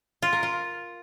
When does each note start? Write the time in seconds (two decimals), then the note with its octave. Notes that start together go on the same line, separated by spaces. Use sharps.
0.22 F4
0.33 A#4
0.43 F4